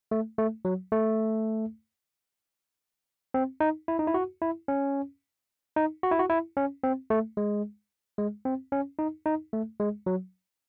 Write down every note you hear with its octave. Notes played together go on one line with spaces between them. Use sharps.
A3
A3
F#3
A3
C4
D#4
E4
D#4
E4
F#4
E4
C#4
D#4
F#4
E4
F#4
E4
C#4
C4
A3
G#3
G#3
C4
C#4
D#4
D#4
A3
G#3
F#3